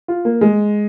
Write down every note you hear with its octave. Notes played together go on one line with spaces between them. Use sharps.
F4
A#3
G#3